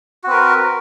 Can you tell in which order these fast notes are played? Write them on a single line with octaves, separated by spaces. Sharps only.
F#4 C4 B4 A#4